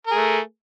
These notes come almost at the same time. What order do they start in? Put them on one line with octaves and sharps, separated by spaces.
A#4 G#4 A3